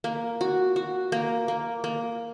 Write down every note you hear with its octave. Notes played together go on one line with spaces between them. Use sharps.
A#3
F#4
F#4
A#3
A#3
A#3